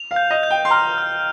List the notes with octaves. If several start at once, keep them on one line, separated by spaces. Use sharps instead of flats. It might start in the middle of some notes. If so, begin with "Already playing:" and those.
Already playing: F7
F5
G6
D#5
G6
G5
C6
A#5 F6
F6